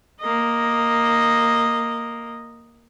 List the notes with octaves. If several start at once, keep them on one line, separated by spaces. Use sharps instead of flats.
A#3 D#5